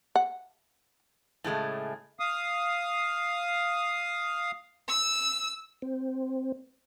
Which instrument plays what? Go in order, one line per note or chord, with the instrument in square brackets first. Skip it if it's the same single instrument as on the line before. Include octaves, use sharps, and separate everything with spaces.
[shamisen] F#5
[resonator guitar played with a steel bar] A2 C#3 G#3 A3
[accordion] F5 D#6
[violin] E6
[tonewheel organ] C4